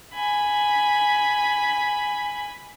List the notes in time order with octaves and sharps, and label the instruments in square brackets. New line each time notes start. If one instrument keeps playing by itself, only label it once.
[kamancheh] G#5 B5